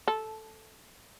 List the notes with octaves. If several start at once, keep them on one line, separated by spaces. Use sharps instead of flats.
A4